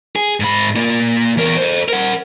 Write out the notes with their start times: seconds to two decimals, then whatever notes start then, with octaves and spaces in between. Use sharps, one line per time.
0.16 G#4
0.40 G#2 B5
0.76 A#3 F4
1.37 E2 A#4
1.57 A4 C5
1.89 A#4 F#5